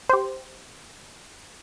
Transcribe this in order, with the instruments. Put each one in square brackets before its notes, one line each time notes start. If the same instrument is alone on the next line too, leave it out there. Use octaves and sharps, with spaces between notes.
[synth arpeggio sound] G4 C5